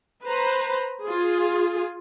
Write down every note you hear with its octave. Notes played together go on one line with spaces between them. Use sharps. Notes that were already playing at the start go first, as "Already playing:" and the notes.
B4 C5 A#5
F4 G#4